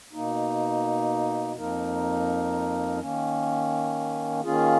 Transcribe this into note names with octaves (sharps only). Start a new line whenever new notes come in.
B2 A#3 D#4
F2 F3 A#3 D#4 A#4
D#3 A#3 C#4
D#3 A#3 C#4 F4 G#4